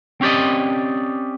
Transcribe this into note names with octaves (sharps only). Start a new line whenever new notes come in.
C4 C#4 G4 D5 D#5